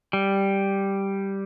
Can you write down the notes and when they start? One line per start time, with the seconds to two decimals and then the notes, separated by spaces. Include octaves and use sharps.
0.13 G3